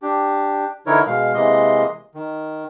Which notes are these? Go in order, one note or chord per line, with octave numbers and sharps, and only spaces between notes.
D4 G4
D3 E3 D#4 E4 A#4 C#5
B2 G#3 F5
C3 E3 G#3 A#3 D#5 C6
D#3